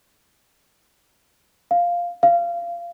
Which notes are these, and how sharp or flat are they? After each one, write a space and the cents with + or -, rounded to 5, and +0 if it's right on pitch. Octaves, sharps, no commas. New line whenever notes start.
F5 +0
F5 -20